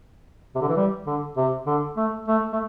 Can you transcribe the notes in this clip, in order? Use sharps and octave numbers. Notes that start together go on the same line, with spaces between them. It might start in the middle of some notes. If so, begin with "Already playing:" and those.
C3
D3
E3
G3
D3
C3
D3
A3
A3
A3